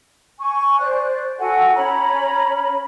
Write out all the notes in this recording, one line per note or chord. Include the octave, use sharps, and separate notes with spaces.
G#5 C#6
C5 D5 F#6
F#4 A4 F#5 G#5
C#4 C#5 A#5 B5